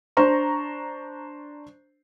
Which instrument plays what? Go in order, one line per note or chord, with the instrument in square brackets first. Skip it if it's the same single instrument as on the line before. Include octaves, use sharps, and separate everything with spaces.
[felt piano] D4 C5 A#5 C#6